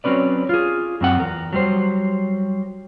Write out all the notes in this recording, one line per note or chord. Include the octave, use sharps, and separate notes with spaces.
F#3 C4 C#4 B4 D5
F4 G#4
F#2 C4 F#5
E2 A#4
F#3 G3 C5